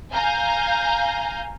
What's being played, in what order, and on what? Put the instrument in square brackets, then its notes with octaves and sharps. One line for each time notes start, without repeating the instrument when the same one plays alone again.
[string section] F5 G#5 A#5 G6